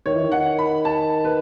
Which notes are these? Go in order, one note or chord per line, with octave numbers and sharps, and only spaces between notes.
D#3 C#5
E3
D#3
F#5
B5
A5
B4